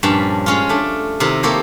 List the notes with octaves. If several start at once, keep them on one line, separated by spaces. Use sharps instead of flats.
G2 A#2 F3 C#4 A5 B5
G#3 C#4 F4
A3 D4
C3 D#3 D#4 E4 A#4
A#3 G4 A4 C5 C#5